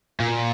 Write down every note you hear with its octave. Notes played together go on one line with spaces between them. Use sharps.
A#2